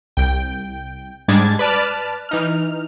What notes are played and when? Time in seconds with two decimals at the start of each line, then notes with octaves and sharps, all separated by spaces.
0.17 C2 G5
1.28 G#2 G3 G#3 D4 G#6 A6
1.59 B4 D5 A5 F6
2.29 E3 D#4 F6